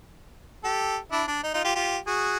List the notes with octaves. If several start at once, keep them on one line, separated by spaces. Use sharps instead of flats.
G4 A4
D4 E4
D4
D#4
D#4 F4
F4 G4
F4 G4
F#4 G#4